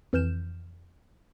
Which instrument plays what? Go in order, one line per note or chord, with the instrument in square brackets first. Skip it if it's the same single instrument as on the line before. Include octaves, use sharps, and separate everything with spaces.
[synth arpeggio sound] F2 E3 F6 G6 E7